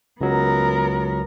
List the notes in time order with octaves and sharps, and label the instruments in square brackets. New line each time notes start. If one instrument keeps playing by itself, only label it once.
[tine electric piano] C#2 F#3 [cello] B3 A#4